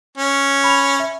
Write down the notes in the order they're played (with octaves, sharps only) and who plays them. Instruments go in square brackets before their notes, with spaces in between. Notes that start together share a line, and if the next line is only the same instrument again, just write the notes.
[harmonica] C#4
[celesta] B5 F7
E5